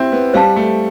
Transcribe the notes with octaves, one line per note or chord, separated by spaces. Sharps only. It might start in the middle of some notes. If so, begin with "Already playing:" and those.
Already playing: C4 E4 G4 C5
B3
G3 C5 F5 A5
A3